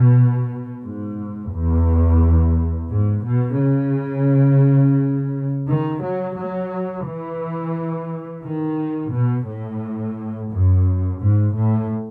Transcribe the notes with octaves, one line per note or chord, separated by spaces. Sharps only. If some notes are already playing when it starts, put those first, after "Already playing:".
Already playing: B2
G#2
E2
G#2
B2
C#3
D#3
F#3
F#3
E3
D#3
B2
A2
F#2
G#2
A2